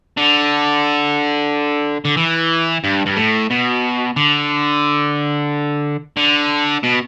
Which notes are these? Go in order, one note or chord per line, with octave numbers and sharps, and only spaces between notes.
D3
D3
E3
G2
G2
A2
B2
D3
D3
B2